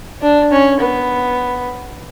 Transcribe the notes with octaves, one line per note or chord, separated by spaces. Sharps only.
D4
C#4
B3